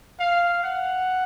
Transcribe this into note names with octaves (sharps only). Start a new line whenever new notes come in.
F5
F#5